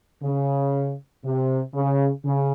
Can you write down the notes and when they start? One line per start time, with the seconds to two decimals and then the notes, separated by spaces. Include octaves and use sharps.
0.23 C#3
1.24 C3
1.74 C#3
2.24 C#3